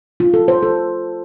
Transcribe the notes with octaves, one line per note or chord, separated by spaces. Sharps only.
F4
A4
C5
A4